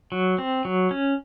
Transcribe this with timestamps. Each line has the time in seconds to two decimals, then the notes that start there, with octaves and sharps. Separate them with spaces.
0.12 F#3
0.38 C4
0.65 F#3
0.91 C#4